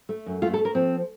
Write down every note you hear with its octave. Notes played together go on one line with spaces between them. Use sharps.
A3
F#2
A3 F4
A4
A3
A#4
F3 C4